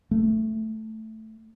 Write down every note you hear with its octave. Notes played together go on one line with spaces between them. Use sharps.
A3